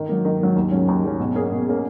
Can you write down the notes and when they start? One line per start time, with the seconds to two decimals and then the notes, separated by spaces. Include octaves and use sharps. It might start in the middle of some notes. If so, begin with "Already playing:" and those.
Already playing: D#3
0.09 F#3 A#3
0.25 D#3
0.40 F#3 A#3
0.56 D#2
0.71 C#3 F#3 C#4
0.88 D#2
1.04 C#3 F#3 C#4
1.20 B2
1.35 A#3 C#4 G#4
1.51 B2
1.66 A#3 C#4 G#4